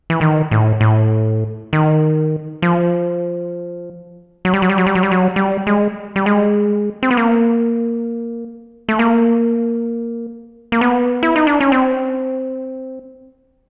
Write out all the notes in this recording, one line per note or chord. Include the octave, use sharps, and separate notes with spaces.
E3
D#3
A2
A2
D#3
F3
F#3
G3
F#3
G3
F#3
G3
F#3
G3
F#3
G3
G#3
G3
G#3
C4
B3
A#3
A3
A#3
A#3
B3
E4
D#4
D4
C#4
C4